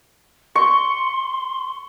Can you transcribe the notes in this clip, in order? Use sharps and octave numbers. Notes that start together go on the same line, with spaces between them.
C6 C#6